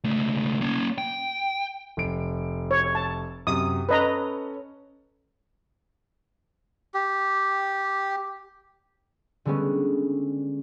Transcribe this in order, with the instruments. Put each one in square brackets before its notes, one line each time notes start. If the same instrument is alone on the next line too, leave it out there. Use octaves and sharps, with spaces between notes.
[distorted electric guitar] C#2 A3
A#3 C#4
G5
[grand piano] F1 D7
[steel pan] C#5
A5
[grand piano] F#2 C3 [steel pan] D#6
[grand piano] C#4 A4 [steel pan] B4 D#5 A#5
[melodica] G4
[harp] D3 G3 G#3 B3 C#4